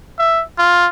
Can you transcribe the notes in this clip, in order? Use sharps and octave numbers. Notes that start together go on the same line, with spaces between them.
E5
F4